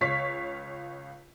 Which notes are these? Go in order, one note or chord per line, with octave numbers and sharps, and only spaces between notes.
C#2 C#5 F5 C#6 B6